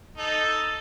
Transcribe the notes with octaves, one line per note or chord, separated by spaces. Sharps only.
D#4 A4